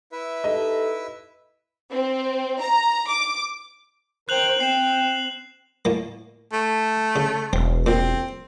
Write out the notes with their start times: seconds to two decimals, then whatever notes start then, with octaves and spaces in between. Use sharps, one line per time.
0.12 E4 B4 E5
0.44 D#4 G4 A4 D#5
1.93 C4
2.61 A#5
3.09 D6
4.29 A#4 C5 G5 F#6 F7 F#7
4.60 C4 G5 C7 E7
5.85 A2 A#3
6.53 A3
7.16 C#3
7.53 E1 C4
7.86 A#2 C4